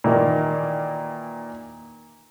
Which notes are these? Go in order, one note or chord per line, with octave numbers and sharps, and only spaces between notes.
A#2 D#3 E3 A#3